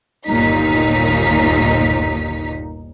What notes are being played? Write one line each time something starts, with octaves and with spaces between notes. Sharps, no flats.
G1 D#2 A#2 D#4 B6